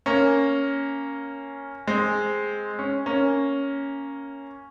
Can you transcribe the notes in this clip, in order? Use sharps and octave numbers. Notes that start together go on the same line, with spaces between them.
A#3 C#4
G#3 C4
C#4
A#3 C#4